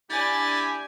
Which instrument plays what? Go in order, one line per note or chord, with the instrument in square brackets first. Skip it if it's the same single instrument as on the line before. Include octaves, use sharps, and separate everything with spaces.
[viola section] D4 G#5 [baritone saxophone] E4 [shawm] G4 [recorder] A6